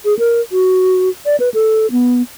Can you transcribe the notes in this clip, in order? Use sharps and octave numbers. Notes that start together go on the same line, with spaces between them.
G#4
A#4
F#4
D5
B4
A4
B3